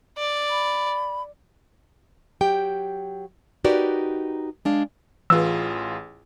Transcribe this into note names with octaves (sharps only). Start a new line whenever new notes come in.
D5
B5
F#3 G4 G5
D#4 F#4 G4 A#4 B4 D5
G#3 D4 F5
A1 E3 F4 G#4 E6